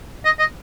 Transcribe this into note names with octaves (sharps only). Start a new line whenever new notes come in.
D#5
D#5